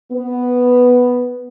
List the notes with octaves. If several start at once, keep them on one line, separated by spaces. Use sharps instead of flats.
B3